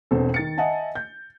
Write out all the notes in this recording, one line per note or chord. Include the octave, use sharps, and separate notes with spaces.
E1 E2 C4 A4
D#3 A6 C#7
D#5 E5 F#5 G#5 A5
G6